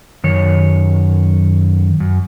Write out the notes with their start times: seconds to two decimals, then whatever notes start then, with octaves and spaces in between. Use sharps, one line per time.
0.24 F#2 D#3 C#5
2.00 F#2